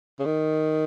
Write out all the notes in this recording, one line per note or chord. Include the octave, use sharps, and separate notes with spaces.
C#3
D#3